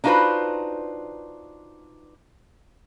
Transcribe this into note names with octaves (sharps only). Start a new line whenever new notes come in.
D4 D#4 F4 F#4 B4 C5